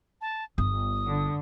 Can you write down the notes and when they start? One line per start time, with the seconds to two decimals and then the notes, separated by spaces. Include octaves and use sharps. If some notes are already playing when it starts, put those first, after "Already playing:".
0.21 A5
0.58 G1 D#6
1.06 D3